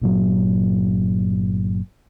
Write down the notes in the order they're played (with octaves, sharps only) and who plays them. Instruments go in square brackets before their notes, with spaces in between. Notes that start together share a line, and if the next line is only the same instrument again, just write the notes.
[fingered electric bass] G1 A#2 F#3